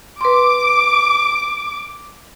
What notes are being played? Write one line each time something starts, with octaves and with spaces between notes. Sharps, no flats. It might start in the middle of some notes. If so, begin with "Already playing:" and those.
B4 C6 D6